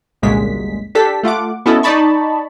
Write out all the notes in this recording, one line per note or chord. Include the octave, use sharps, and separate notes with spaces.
G1 C2 F#2 A#2 G#3 B6
D4 G4 A4 B6
A3 F4 F#5 D6
B3 C#4 E4 F#4 A4 D#5
D#4 D5 D#5 A5 B5 C#6